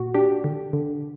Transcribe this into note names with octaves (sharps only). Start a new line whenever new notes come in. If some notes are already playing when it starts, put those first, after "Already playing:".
Already playing: A#2 F#4
D4 G4
D3
D3